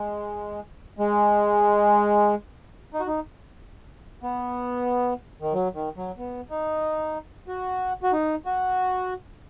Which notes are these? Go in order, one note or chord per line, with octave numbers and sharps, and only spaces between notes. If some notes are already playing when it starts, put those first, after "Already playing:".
Already playing: G#3
G#3
D#4
F#4
D#4
B3
D#3
F#3
D#3
F#3
B3
D#4
F#4
F#4
D#4
F#4